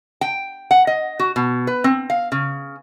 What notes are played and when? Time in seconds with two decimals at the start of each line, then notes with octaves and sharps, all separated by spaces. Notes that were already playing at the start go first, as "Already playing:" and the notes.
0.21 G5
0.71 F#5
0.87 D#5
1.19 F#4
1.36 B2
1.67 B4
1.84 C4
2.10 F5
2.32 C#3